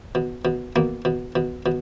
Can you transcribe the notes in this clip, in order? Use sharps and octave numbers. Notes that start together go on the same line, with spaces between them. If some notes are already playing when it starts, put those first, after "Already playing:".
B2
B2
B2 A#3
B2
B2
B2